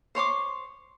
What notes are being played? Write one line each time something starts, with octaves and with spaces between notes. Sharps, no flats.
C5 C#5 C6 D6